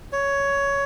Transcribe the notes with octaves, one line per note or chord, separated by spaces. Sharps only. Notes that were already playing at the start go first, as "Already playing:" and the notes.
C#5